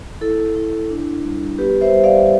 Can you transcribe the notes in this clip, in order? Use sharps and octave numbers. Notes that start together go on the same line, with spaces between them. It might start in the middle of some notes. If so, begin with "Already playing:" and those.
E4 A4
E4
D4
G3
B3 G4 B4
C5 E5
G3
D5 F5